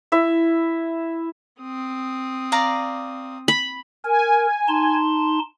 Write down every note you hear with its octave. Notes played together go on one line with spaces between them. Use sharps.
E4 E5
C4 D#6
D5 F5 A#5
B5
A#4 G#5
D#4 A5 C6